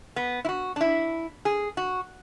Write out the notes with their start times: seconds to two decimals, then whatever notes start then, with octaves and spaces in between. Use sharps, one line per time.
0.16 B3
0.45 E4
0.49 F#4
0.76 D4
0.81 E4
1.45 G#4
1.77 F#4